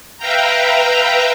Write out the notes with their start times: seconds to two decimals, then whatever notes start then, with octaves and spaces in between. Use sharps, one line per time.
0.18 B4 E5 F5 G5 A#5